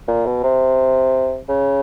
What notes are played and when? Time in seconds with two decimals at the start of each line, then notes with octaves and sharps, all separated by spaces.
0.08 A#2
0.26 B2
0.43 C3
1.49 C#3